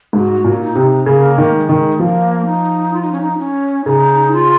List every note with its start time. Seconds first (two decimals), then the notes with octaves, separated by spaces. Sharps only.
0.13 G#2 F#4
0.44 A#2
0.56 C#4
0.61 D#4
0.75 C3
1.06 C#3 A#3
1.38 D#3
1.53 G#3
1.69 D#3
1.99 F3 A#3
2.46 D#4
2.93 F4
3.02 D#4
3.12 C#4
3.21 D#4
3.39 C#4
3.86 C#3 D#4
4.32 F4